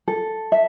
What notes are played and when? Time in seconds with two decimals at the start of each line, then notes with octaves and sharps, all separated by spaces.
0.08 A4
0.52 E5